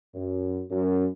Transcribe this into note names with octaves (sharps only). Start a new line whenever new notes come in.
F#2
F#2